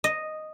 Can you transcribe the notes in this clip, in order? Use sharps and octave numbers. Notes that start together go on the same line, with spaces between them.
D#5